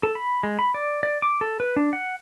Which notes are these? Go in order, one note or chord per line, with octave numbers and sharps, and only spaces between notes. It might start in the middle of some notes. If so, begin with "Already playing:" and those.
A4
B5
G#3
B5
D5
D5
D6
A4
B4
D4
F#5